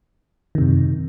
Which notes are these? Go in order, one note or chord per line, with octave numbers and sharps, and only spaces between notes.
F#2 C3 D#3